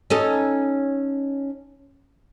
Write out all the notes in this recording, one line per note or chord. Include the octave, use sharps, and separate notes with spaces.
C#4 D#4 A4